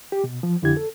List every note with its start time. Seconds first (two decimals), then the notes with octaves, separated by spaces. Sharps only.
0.12 G4
0.24 B2
0.43 F3
0.62 F2 D3 E4 G4 G#6
0.77 A4